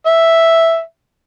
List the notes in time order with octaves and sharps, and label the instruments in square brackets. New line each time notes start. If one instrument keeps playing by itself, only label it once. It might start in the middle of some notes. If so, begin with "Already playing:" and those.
[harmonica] E5